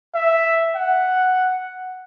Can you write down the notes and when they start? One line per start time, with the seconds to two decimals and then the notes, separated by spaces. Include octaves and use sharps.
0.14 E5
0.75 F#5